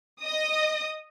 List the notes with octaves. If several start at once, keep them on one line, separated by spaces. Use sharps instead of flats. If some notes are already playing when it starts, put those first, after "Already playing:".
D#5 D#6